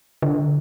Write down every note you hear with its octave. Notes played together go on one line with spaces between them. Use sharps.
D3